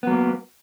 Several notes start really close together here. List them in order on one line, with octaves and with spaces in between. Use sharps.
B3 F#3 A#3